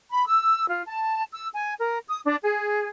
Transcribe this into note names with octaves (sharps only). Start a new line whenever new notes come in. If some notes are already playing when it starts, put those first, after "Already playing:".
B5
E6
F4
A5
E6
G#5
A#4
D#6
D4
G#4